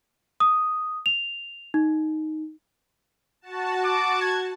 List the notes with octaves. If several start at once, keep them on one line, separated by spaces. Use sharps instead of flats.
D#6
F7
D#4
F#4 A5
D6
G#6